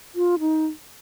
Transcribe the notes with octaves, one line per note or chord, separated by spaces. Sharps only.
F4
D#4